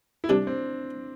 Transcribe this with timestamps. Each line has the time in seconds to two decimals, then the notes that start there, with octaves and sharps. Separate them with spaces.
0.24 E4
0.29 C2 C3 G3 D4
0.47 C4